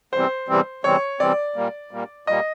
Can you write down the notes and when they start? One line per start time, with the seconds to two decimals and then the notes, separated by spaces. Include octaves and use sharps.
0.13 E2 C3 E3 G3 C4 C5
0.48 E2 C3 E3 G3 C4
0.84 E2 C3 E3 G3 C4 C#5
1.20 E2 C3 E3 G3 C4 D5
1.56 A#2 G3 A#3
1.91 A#2 G3 A#3
2.27 A#2 G3 A#3 D#5